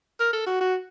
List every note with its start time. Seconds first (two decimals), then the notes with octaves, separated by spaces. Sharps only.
0.20 A#4
0.33 A4
0.46 F#4
0.61 F#4